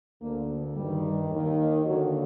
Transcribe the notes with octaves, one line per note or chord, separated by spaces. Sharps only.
D2 D3 A#3
G2 D#3 G3
D#2 D#3
D#2 D3 F#3